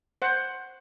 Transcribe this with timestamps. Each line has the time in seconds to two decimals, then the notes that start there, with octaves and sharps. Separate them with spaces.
0.22 C5 F#5